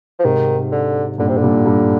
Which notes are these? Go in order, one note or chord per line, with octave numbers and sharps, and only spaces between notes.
F3
G#2 C3 D#3
D3
G2 A#2 D3
C3
D3
G2 A#2
G2